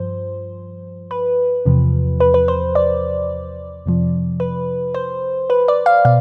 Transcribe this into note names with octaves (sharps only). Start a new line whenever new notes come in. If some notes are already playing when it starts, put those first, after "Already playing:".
Already playing: G2 F3 C5
B4
E2 C3 F3
B4
B4
C5
D5
F2 C3 F3
B4
C5
B4
D5
F5
B2 F5